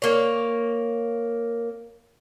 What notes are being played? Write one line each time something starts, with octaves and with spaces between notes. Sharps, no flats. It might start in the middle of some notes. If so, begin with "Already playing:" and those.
A#3 C#5